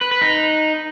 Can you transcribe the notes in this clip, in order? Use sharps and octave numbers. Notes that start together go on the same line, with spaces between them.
B4
B4
D#4